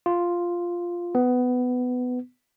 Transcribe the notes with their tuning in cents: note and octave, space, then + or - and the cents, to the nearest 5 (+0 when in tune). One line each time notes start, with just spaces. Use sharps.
F4 +0
B3 +15